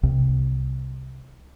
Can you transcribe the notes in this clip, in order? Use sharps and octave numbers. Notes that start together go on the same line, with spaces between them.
C2